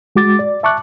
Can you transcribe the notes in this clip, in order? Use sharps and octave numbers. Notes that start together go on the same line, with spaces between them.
G#3 F#4 D6 A6
D5
E5 A5 C#6 D6 F#6